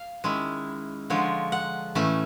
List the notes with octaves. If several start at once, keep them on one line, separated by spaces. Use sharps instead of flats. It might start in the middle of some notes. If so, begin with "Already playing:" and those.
Already playing: F5
D#3 G#3 C#4 E4
D3 F3 G#3 C#5
F#5
A2 E3 A3 C#4